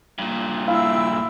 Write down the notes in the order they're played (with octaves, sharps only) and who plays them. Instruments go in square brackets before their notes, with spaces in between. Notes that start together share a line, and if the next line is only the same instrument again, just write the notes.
[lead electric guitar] G2 A#2
[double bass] E4 [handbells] F5 [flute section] G5 E6